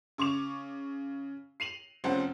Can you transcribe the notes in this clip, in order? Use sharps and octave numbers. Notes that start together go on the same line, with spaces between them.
C#3 C#6 D6 F7
C7 D#7 F7 F#7
F1 F3 C4 C#4 F#5